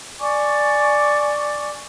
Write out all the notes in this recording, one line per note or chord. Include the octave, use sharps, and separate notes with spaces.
D5 G#5 C#6 D6